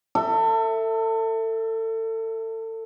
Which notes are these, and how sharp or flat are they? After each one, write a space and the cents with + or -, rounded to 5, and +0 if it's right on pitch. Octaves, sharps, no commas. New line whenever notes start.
A4 +30 E5 +0